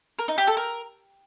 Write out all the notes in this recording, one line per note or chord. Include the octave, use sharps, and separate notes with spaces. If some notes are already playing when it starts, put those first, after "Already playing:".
A#4
D#4
G4
A4
A#4